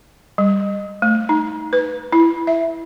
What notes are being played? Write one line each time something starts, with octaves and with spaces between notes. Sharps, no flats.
G3
A3
D#4
B4
E4
E5